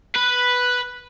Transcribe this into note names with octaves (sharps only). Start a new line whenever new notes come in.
B4